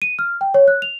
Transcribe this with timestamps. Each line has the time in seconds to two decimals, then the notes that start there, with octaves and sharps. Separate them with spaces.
0.02 D#7
0.19 F6
0.41 G5
0.54 C#5
0.68 F#6
0.82 F7